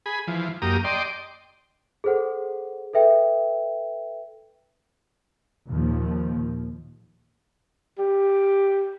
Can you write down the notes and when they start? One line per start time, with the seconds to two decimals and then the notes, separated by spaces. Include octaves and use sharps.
0.06 G#4 B5
0.28 E3 F3
0.62 F#2 A#3 G4 A#5 D#6
0.84 D5 D#5 G5 C6
2.04 G#4 A4 C5 F#5
2.93 A4 B4 E5 G5
5.69 D#2 A#2 D#3 F3
7.99 G4